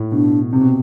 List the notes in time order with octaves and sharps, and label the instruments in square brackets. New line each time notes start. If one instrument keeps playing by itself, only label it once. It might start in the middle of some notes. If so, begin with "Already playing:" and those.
Already playing: [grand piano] A2
[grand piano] B2 [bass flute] D4
[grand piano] C3 [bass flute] C4
[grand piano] B2